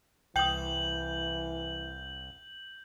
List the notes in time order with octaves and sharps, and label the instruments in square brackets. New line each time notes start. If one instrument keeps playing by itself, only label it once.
[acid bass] C2 [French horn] E3 [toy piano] G5 D#6 [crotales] G6 F#7